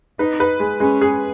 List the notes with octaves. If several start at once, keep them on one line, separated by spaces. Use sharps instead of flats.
D#4 B4
B4
G#3
G#3 C#4
G#4